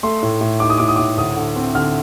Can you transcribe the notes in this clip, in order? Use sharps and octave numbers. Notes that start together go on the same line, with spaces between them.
A3 C6
A2
A2
D#4 D6
D#6
A2 D6
D#6
A2 D6
D2 D#6
D3
C4
D3 F6